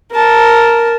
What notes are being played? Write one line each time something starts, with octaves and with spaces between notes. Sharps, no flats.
A#4 A5